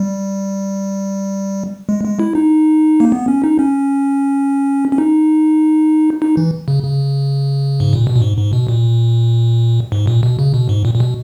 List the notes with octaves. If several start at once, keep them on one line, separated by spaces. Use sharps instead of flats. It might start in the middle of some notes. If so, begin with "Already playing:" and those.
Already playing: G3
G#3
G#3
E4
D#4
A#3
B3
C#4
D#4
C#4
C#4
D#4
D#4
E3
C#3
C#3
G#2
A#2
B2
A#2
G#2
G#2
B2
A#2
G#2
A#2
B2
C#3
B2
G#2
A#2
A#2
B2